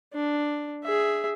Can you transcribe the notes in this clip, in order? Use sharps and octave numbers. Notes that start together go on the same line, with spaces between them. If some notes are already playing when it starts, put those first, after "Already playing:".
D4
G#4 E5